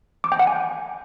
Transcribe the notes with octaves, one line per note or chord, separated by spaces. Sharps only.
D6
G5
F#5
G#5